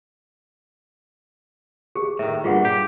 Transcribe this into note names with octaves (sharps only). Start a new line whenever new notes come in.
G4 G#4
A2 D#3 E5
G2 A#2 F4 G#4 F#5
G4